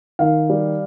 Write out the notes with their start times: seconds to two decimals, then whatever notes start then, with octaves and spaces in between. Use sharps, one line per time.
0.19 D#3 F5
0.50 G3